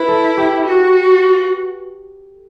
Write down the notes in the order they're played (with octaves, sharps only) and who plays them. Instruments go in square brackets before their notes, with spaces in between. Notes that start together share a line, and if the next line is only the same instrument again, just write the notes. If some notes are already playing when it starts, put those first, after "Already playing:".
Already playing: [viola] E4 [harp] B4
[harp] A4
G4
[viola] F#4